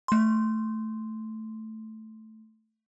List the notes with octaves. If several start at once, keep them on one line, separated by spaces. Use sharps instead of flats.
A3 C6